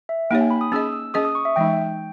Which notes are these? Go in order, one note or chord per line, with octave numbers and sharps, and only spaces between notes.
E5
A#3 D#4 G4 C#5 G5
G#5
B5
D#6
C#4 G#4 D#5 E6
E6
C#4 G#4 D#5 D#6
D#6
C#6
E5
E3 G#3 D#4 G5